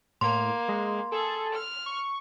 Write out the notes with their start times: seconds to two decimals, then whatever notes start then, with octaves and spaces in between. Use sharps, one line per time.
0.21 A2 A#3 C6
0.68 G#3
1.12 G#4 A4
1.53 F6
1.86 C#6